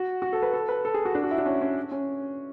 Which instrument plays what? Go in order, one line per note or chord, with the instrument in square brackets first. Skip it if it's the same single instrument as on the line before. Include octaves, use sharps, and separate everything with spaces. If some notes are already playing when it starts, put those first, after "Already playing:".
Already playing: [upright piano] F#4
F#4
A4
B4
A4
B4
A4
G#4
F#4
D4
F#4
E4
D4
C#4
C#4
C#4